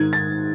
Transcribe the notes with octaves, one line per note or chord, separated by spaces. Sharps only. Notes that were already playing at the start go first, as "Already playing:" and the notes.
Already playing: G#2 D#3 G#6
A6